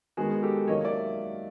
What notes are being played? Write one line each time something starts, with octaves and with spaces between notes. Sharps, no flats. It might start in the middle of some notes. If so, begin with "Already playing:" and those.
D#3 G#3 B3 F#4 G#4
G4 A4
D#3 F#3 A#3 C#5 D#5
D5 E5